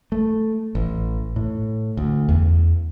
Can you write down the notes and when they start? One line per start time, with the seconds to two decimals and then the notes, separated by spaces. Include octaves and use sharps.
0.12 A3
0.75 A1
1.36 A2
1.97 D2
2.29 E2